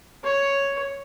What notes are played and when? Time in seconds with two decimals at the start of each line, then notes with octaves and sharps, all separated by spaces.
0.24 C#5